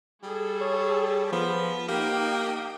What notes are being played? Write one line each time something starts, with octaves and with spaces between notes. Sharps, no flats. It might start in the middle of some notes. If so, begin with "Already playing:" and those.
G3 G#4 A4
C#5
F3 B3
A#3 D#4 G4 G5